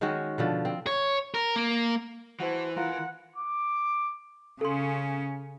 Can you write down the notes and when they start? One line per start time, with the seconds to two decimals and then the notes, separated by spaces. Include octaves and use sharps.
0.01 D#3 G#3 C#4 F#4
0.38 B2 D3 F3
0.65 C4
0.87 C#5
1.34 A#4
1.56 A#3
2.40 E3 F#4 C5 A5
2.77 F4 A#4 F#5 A#5
3.35 D6
4.61 C#3 C#4 A4 C6